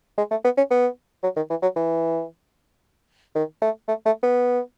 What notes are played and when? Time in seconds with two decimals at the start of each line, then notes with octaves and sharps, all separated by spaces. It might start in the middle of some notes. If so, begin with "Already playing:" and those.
0.18 G#3
0.31 A3
0.44 B3
0.57 C#4
0.71 B3
1.23 F#3
1.36 D#3
1.50 E3
1.62 F#3
1.76 E3
3.35 D#3
3.62 A3
3.88 A3
4.06 A3
4.23 B3